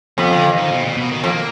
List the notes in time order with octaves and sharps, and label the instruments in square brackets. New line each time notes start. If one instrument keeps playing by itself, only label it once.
[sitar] F2 [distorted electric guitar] B3
[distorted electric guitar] D3
D#3
B2
A#2
B2
D#3
[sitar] F2 [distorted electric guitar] A#3